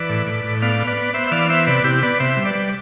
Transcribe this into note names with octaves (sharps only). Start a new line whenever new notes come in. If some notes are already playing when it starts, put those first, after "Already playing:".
Already playing: E3 B4 D5
A2
A2
A2
B3 D5 F5
B3
B4 D5
B3
B3 C5 E5
E5
E3 D5 F5
B3 C5 E5
C3 B4 D5
C3 E4 G4
B3 B4 D5
C3 C5 E5
G3
B4 D5
G3